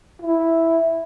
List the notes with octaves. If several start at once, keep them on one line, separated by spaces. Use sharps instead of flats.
E4